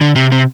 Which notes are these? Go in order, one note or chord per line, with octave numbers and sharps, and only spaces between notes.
D3
C3
C3